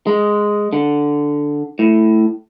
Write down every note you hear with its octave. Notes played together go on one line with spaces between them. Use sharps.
G#3
D3
A2